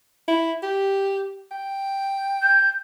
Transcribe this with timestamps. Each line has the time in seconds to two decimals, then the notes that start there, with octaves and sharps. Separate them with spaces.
0.28 E4
0.63 G4
1.51 G5
2.42 G6